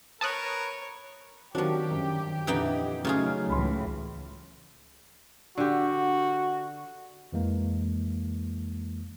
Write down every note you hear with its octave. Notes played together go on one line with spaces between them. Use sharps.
A#4 B4 C#5 A5 D#6 F#6
D#3 F3 F#3 C4 D4 F#4 G4
G1 F#2
F2 A#2 D3 E3 D#4 G5
C#3 F#3 A3 D#4 F4 G#4
C#2 A2 E3 B5 C6
D3 F#4 G4
F2 E3 G#3 A#3